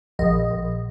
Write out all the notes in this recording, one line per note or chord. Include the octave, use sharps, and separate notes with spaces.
A#1 D#5
A#1